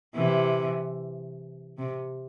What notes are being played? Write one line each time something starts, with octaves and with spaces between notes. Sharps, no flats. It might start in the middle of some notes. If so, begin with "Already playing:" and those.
C3 E3
C3